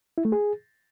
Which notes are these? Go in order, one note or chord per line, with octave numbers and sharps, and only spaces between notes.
E4
A3
G#4